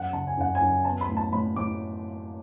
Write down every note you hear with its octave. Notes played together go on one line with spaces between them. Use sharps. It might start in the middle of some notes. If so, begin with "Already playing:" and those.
Already playing: F#2 F#5
C#3 A5
G#5
F#2 F#5
G#5
F#2
B3 A5
B5
A2
A5
A2 B5
A2 D6